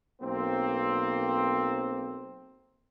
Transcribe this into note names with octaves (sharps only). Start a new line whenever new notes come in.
B1 A#3 C4